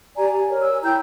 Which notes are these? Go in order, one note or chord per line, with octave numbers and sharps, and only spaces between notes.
G4 D5 G#5 A#5
G#5
A#4 C#5
G#5 E6
E4 G5 A#5 G6